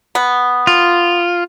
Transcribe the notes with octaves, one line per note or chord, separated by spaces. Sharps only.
B3
F4